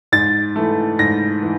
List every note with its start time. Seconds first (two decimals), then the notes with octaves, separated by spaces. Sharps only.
0.12 G#2 A6
0.56 E3 A3
0.99 G#2 A#6
1.42 E3